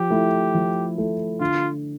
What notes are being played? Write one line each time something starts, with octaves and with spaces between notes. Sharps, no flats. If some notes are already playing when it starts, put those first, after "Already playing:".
Already playing: F3 G4
A3 E4
F3
A3 E4
D3 F4